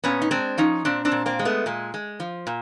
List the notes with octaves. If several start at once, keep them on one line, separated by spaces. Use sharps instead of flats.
A#2 B3 C#4
D#4
G#3 C4 D4
F3 C#4 D#4
A#2 C4 D4
C4 D4
A#2
A#3 C4
G#3
A3 B3
A#2 G#3
G#3
F3
A#2